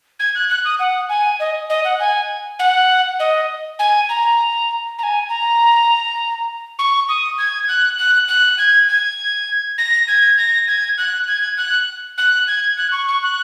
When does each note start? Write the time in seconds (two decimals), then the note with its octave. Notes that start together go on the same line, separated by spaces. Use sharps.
0.19 G#6
0.35 F#6
0.50 F#6
0.65 D#6
0.80 F#5
1.09 G#5
1.40 D#5
1.70 D#5
1.84 F#5
2.00 G#5
2.59 F#5
3.20 D#5
3.79 G#5
4.09 A#5
4.98 A#5
5.03 G#5
5.29 A#5
6.79 C#6
7.09 D#6
7.38 G#6
7.68 F#6
7.98 F#6
8.28 F#6
8.58 G#6
8.88 G#6
9.78 A#6
10.08 G#6
10.38 A#6
10.67 G#6
10.98 F#6
11.28 G#6
11.57 F#6
12.18 F#6
12.47 G#6
12.77 F#6
12.92 C#6
13.08 C#6
13.23 F#6